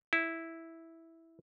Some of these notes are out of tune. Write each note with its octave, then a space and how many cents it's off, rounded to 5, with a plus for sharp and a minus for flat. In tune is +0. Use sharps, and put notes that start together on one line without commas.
E4 -5